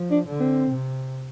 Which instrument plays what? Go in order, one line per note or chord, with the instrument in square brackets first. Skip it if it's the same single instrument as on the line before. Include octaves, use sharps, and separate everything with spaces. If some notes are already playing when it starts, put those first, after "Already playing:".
Already playing: [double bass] F3
[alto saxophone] D4
[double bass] D3
[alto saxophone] C4
[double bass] C3